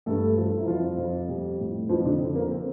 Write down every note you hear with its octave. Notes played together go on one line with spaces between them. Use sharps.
G2 A3 A4
F3
E4
F2 F3 F4
F2
G3
A2
F2 F3 F4
D3 D4
F2 C4
A#3
C4